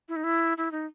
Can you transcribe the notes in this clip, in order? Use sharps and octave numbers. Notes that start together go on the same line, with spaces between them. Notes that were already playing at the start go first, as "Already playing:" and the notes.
E4
D#4
E4
E4
D#4